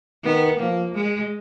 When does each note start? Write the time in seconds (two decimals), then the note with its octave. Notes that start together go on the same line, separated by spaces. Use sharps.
0.24 D#3 B3
0.60 F3 A#3
0.95 G#3